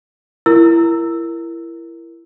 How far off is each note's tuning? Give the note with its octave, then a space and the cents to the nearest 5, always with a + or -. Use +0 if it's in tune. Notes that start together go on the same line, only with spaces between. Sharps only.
E4 +25 A#4 +0 E6 +0